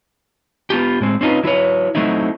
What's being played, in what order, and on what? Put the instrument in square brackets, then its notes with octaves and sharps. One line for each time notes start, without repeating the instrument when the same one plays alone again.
[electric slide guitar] B3 F4 G4
A2 G#3 C4
C4 C#4 D#4 F4 B4
F#3 E4 B4 C#5
F#3 A3 C4 D#4 E4